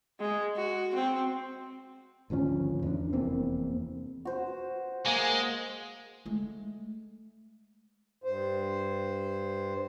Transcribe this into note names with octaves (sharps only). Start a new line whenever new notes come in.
G#3
F#4
C4
G#1 D2 F3 C#4
E2 D4
F1 E2 A#3 C4
F#4 C5
G#3 A#3
G#3 A3
G2 C5